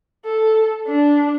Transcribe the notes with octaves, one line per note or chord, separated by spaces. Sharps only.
A4
D4